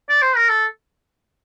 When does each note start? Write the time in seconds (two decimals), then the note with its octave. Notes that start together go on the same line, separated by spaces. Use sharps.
0.09 D5
0.22 C5
0.36 A#4
0.50 A4